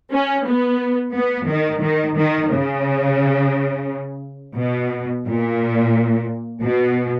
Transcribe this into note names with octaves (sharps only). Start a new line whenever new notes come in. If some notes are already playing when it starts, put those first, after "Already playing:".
C#4
B3
B3
D#3
D#3
D#3
C#3
B2
A#2
B2